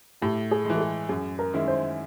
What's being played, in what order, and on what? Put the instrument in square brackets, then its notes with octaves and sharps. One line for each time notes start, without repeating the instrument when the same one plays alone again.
[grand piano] A2 [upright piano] G4
[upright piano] G#4
[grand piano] E3 G#3
[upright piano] A4
G#4
[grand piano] F#2 [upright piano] G#4
[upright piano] A#4
[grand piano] D#3 G#3 C#4 E4
[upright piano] C5